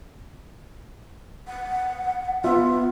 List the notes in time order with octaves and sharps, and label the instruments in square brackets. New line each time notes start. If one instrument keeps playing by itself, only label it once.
[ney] F#5
[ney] B3 [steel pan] F4 E5